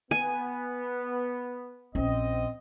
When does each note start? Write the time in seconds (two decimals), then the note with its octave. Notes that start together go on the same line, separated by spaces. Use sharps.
0.11 B3 G#5
1.95 A#1 C4 C#4 D#5